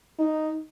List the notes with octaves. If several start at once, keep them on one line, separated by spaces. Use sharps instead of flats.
D#4